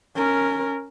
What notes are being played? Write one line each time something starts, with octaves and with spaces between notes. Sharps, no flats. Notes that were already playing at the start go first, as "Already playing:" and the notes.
C#4 A#4